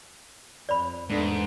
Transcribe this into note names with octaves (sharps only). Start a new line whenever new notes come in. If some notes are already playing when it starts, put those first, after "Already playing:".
F2 D5 B5
E2 G#2 A3 D4